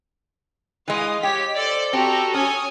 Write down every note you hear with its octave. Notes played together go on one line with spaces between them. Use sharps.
E3 G#3 D#5 F5 D#6
G4 C#5 G5 B6
A4 C5 D5
C4 F#4 G4 A5 A#5
C#4 C#5 G#5 D#6